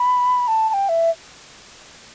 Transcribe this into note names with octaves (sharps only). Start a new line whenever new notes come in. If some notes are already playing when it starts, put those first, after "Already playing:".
Already playing: B5
A5
A5
G5
E5